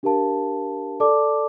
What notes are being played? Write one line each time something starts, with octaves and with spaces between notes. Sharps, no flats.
D4 G4 A#4 F5 A5
A4 D5 A5 D6